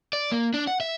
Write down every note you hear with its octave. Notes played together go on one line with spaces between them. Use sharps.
D5
A#3
D4
F#5
E5